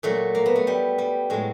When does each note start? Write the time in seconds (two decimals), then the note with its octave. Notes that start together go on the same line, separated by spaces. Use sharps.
0.03 A#2 F#3 A3
0.35 A#3
0.46 B3
0.56 A3
0.67 G3
0.98 G3
1.30 A2 F#3 G#3